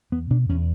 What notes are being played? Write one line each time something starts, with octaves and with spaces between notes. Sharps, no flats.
E2 B3
B2 D4
E2 C#4